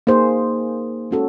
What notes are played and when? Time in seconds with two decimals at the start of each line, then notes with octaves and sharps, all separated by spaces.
0.07 A#3 D#4 G#4 C5
1.11 G#3 C#4 F#4 A4